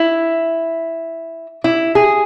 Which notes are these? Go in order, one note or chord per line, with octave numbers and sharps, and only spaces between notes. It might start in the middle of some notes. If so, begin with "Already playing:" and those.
Already playing: E4
E4
G#4